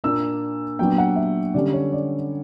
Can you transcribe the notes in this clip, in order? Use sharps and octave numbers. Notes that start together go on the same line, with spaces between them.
A#2 A#3 D4 E6
A#2 F#3 B3 D4 G5
F#5
E5
D3 G3 C#4 D5
C#5
D5